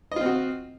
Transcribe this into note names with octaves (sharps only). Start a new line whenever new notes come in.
C4 F4 F#4 D#5